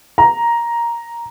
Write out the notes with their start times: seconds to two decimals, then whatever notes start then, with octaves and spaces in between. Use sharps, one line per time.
0.18 A#5